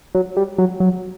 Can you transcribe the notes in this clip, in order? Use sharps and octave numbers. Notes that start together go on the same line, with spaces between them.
F#3
G3
F#3
F#3